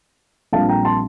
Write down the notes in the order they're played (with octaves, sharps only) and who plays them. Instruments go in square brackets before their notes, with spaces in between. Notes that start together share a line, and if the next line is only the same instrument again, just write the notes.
[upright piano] A#1 A#2 G3 C4 F5 A5
G5 A#5
A5 C6